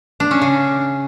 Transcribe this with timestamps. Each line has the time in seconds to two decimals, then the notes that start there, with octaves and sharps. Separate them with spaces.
0.20 D4
0.31 C#4
0.42 C#3